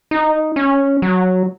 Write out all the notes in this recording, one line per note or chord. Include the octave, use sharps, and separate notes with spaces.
D#4
C#4
F#3